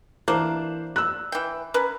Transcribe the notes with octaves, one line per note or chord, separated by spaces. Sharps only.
E3 A#3 D4 C5
E6 F#6
E3 G5
C#4 A#4 B4